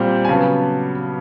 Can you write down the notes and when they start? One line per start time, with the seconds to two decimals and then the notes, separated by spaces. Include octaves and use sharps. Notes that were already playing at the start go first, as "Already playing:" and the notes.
Already playing: A#2 G3 C4
0.25 G#5
0.29 C#3 F#3 B3 A5